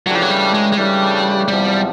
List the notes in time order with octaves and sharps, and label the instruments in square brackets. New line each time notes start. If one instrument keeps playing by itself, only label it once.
[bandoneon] C#3 E3 A3 D4 G4 [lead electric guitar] F#3
[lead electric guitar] F3
F#3
G3
G#3
G#3
[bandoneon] C#3 E3 A3 D4 G4 [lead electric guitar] G3
[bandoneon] E2 C3 F3 [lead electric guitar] G3